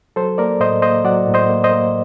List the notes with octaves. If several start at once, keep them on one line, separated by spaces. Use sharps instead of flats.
F#3 A4 C5
A#3 A#4 D5
A2 C5 D#5
A#3 C5 D#5
F#3 D5 F#5
A2
C5 D#5
A#3
C5 D#5
A#3